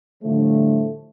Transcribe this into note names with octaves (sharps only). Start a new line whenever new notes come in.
A2 D3 F3 G3 A3